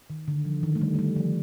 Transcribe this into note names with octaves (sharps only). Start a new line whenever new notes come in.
D#3
D3
F3
D#3
A3
G3
A3
G3
F3